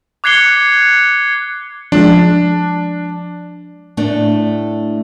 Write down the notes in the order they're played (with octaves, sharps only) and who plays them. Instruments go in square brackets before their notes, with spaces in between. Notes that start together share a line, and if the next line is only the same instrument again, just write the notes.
[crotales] D6 F#6 G#6 C7 C#7 G7
[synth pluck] F3 G#3 [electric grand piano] D4
[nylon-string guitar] A2 A3 D4